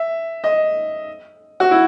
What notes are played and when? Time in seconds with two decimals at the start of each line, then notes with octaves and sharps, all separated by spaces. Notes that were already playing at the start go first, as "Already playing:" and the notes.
Already playing: E5
0.44 D#5
1.60 F#4
1.71 E4